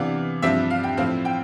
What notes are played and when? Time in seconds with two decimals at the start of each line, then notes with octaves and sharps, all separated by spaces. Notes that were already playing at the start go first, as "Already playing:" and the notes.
Already playing: C3 E3 B3 D4 F5
0.42 G2 F3 C4 E5
0.70 F5
0.84 G5
0.97 A2 F3 C4 F5
1.25 G5